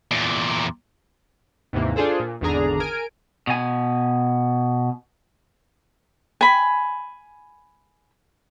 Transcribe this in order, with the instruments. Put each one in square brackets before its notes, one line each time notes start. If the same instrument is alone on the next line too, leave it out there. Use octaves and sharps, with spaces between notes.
[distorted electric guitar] E2 A#2
[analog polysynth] D#2 G#2 C3 E3 A#3
D4 F4 G#4 A4 C5
A#2
G#1 E2 D3 D4 G#4 A#5
A#4 G#5 D7
[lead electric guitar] B2 G#5
[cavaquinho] G#5 B5